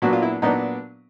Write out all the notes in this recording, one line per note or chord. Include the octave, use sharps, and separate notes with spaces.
A#2 F#3 B3 D4 F#4
F4
E4
A#2 F#3 B3 D4 D#4